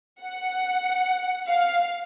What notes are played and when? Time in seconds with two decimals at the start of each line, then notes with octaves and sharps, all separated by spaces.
0.21 F#5
1.49 F5